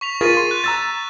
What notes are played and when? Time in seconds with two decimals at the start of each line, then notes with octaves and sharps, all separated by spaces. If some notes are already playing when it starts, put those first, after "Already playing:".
0.01 C#6 B6 F7
0.21 F4 G#4 A#4 A6 B6 D#7
0.37 C6
0.51 F#6
0.64 A#5 E6 A6